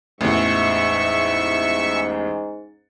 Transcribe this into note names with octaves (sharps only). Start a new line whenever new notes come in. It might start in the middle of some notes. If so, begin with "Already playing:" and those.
A1 E2 G#2 E5 C#6